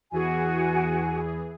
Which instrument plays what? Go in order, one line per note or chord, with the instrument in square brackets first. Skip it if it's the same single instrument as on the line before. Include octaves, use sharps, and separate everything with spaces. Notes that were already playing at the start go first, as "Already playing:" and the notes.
[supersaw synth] E2 E3 G#4 [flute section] F#4 G#5